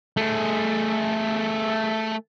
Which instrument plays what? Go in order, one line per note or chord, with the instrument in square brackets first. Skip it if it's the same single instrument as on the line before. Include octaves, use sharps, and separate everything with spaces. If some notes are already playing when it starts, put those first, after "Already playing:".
[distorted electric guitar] A3 G#4